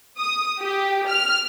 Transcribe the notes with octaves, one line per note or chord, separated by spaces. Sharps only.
D#6
G4
F6